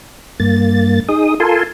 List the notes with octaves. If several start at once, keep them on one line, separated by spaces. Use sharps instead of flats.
G2 A#3 A6
D#4 G#4 D#6
F4 A4 A#4 G#5 A5 C6